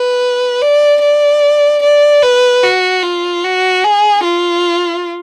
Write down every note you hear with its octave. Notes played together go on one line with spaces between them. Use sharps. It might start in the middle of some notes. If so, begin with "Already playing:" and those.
Already playing: B4
D5
D5
D5
B4
F#4
F4
F#4
G#4
F4